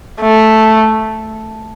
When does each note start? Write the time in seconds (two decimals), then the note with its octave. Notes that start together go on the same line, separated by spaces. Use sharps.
0.21 A3